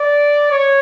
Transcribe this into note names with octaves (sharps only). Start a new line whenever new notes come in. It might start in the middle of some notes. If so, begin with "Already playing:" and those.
Already playing: D5
C#5